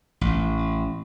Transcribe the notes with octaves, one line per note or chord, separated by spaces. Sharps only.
A1